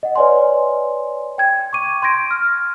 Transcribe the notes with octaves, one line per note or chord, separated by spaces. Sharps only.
D#5 F#5
B4 C#5 D5 G#5 C6
G5 G#6
C#6 D6 D#7
C6 G6 G#6 A#6 D7
F6